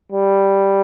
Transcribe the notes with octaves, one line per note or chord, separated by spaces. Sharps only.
G3